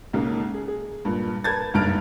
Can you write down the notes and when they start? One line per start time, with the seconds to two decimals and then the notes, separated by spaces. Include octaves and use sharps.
0.13 B1 G#2 C#3 A#3
0.54 G#4
0.68 G#4
1.05 G2 A#2
1.44 A#4 B4 A5 G#6 A6
1.74 F#1 B1 G2 A#5 F6 D7